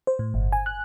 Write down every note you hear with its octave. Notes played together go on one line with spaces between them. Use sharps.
C5
A2
G1
G#5
F#6